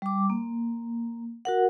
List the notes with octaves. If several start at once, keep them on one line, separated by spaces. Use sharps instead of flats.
G3 D6
A#3
F#4 A#4 F#5